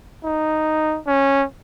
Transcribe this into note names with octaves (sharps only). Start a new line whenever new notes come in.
D#4
C#4